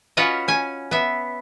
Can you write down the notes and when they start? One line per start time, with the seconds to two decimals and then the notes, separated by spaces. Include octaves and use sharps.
0.17 C#4 F4 F#4 B4 C#5 D#5
0.48 C#4 G#5
0.91 B3 E5